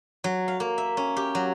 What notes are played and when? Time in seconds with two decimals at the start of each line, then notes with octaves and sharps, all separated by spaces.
0.24 F#3
0.48 F5
0.60 A#3
0.78 E5
0.97 C#4
1.17 G4
1.35 F#3